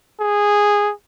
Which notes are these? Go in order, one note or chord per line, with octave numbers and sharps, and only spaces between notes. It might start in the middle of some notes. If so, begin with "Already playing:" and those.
G#4